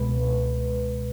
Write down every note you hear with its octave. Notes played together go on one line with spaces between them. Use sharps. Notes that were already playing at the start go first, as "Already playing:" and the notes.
Already playing: C#2 B2 G#3 B4